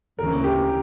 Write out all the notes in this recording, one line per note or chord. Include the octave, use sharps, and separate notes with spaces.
D2 C#3 E3 A#3 C#4 A#4
G4